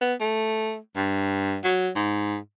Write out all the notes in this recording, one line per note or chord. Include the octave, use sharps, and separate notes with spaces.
B3
A3
G2
F#3
G#2